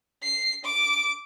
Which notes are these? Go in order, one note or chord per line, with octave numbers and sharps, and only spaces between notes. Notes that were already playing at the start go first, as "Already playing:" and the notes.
C7
D6